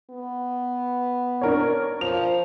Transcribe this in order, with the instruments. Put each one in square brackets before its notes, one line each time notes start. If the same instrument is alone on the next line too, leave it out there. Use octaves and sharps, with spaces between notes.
[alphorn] B3
[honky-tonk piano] D4 A#4 C#5
[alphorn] F3 [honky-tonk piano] F7